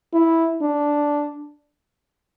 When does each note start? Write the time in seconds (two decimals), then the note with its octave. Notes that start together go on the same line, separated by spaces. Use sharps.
0.14 E4
0.62 D4